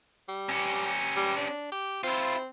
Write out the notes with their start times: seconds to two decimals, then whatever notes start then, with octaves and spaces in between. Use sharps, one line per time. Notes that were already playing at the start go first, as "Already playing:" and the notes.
0.28 G3
0.49 C#4 G4
1.17 G3
1.37 D4
1.72 G4
2.03 C4 E4 F4